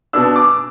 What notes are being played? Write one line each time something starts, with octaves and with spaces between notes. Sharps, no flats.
B2 B3 D4 E6
D6